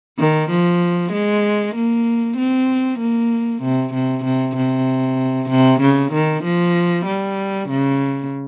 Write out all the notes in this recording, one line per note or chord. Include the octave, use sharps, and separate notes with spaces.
D#3
F3
G#3
A#3
C4
A#3
C3
C3
C3
C3
C3
C#3
D#3
F3
G3
C#3